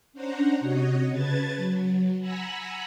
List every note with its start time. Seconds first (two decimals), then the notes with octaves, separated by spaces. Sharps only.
0.13 C#4 D4 C5 F#5 A#5
0.60 C3 F#4 C#5 D#5
1.11 C#3 B4 A5 G#6 A6
1.57 F#3
2.20 F#5 G#5 A#5 B5 E6 F#6